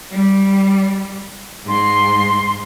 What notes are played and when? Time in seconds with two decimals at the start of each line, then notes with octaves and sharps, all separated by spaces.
0.14 G3
1.68 G#2 C6